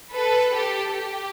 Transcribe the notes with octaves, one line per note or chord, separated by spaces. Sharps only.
A4 B4
G4 A4
G4